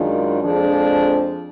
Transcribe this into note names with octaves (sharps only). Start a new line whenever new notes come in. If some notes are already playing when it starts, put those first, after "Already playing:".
Already playing: F#2 D#3 G#3 D4 F4
F2 F3 G#3 D4 G#4